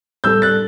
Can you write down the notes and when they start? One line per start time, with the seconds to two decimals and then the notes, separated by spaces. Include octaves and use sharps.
0.24 A2 G3 D4 A4 E6 G6
0.42 F#6 A6